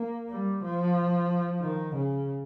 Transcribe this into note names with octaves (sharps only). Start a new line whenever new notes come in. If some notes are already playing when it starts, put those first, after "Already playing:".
Already playing: A#3
G3
F3
D#3
C#3